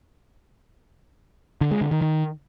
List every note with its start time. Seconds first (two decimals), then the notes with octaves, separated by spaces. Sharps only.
1.61 D3
1.71 G#3
1.81 D3
1.91 D#3
2.01 D#3